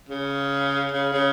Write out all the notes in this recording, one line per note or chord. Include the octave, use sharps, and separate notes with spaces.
C#3
C#3
C#3